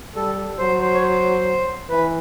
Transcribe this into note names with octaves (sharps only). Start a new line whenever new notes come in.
G3 A4
A4
F#3 C5
C5
C#5
C5
E3 B4